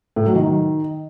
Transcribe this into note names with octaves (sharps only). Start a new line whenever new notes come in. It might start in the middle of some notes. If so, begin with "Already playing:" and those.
A2
F#3
D#3